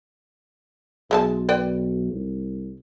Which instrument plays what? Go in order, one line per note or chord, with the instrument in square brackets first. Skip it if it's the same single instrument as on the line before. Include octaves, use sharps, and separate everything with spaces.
[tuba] B1 [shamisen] G#3 A4 A5
[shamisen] B4 D5 G5
[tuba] C2